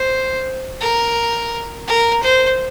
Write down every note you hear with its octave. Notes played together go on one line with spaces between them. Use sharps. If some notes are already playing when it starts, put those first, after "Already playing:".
Already playing: C5
A#4
A#4
C5